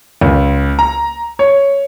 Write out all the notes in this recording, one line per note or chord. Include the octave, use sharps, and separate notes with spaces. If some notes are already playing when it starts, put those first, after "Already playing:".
C#2
A#5
C#5